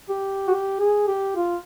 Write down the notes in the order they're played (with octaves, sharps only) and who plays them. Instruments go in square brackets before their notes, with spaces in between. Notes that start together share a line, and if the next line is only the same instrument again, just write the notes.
[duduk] G4
F#4
G4
G#4
G4
F4